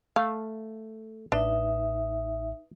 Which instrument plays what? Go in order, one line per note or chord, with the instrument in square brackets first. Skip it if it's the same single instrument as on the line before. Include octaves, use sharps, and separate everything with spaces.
[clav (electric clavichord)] A3 [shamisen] F5
[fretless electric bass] A1 [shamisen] D4 [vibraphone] D#4 E5 [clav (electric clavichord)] B4